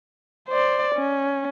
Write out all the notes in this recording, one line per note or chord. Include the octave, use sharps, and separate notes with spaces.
C5 D5
C#4